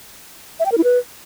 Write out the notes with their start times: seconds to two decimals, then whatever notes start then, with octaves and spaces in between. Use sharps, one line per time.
0.60 E5
0.66 G5
0.72 A#4
0.78 E4
0.84 B4